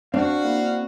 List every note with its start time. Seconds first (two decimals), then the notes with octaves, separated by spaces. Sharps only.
0.14 C4 D4 F#4 F5
0.45 A#3 E4